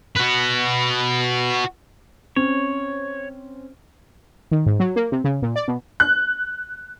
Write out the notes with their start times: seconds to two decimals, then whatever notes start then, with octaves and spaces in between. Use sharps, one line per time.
0.17 F#4 B4
2.36 C4 C#4 C#5
4.51 D#3
4.66 G#2
4.80 F#3
4.96 A#3
5.12 C3
5.24 C#3
5.42 A#2
5.56 D5
5.68 B2
6.00 F#6